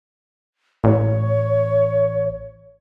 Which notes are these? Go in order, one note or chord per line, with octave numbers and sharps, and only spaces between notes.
A1 C#5